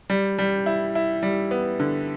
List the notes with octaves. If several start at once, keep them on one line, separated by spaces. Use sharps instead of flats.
G3
G3
E4
E4
G3
B3
D3